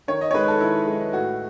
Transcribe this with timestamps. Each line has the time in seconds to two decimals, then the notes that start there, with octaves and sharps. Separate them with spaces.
0.08 D#3 C#5
0.21 D#5
0.31 C#5
0.34 G#3 D#4 B4
0.48 A4
0.61 D#3 E4
0.87 G#3 D#4
1.13 A2 F#4